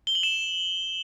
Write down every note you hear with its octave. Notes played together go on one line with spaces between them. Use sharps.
G7
F#7
E7